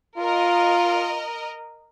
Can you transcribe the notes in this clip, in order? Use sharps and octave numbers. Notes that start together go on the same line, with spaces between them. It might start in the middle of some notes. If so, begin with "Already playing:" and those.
F4 A#4 D#5